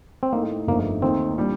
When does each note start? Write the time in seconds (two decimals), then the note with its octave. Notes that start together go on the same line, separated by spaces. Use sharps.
0.23 C4
0.33 A2 A3 A#3 D#4
0.67 G1 F2 D3 A3 A#3 D#4
1.02 D#2 D#3 A3 C4 D#4
1.37 A#2 G3 D4